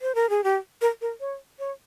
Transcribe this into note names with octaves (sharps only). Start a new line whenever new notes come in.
C5
A#4
G#4
G4
A#4
A#4
C#5
C#5